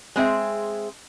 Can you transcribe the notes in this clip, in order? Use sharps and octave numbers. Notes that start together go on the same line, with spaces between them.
G#3 C4 G#4 E5